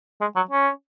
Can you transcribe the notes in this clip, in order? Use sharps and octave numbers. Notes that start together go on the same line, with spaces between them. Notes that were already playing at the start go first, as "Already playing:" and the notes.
G#3
F#3
C#4